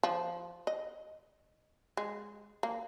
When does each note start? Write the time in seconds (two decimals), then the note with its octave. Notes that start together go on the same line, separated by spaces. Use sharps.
0.03 F3
0.67 D#5
1.97 G#3
2.63 A#3